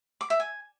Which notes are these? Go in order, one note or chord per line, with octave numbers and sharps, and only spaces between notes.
D6
E5
G#5